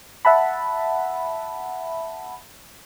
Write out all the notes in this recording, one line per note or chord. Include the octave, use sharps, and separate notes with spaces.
E5 F#5 A5 B5